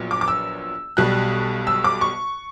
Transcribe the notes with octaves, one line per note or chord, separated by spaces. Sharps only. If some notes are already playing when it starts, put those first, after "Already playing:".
Already playing: A#1 A#2 F#3 B3
D6
D6
E6
B1 B2 G3 F#6
E6
D6
C#6